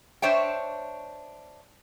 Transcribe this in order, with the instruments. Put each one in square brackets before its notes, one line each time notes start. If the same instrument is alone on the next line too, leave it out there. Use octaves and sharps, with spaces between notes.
[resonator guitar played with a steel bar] D4 C5 C#5 E5 G5